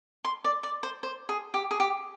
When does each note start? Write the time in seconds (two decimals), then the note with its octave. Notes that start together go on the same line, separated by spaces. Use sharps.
0.25 C6
0.44 D5
0.63 D5
0.83 C5
1.03 C5
1.29 G#4
1.54 G4
1.71 G#4
1.80 G4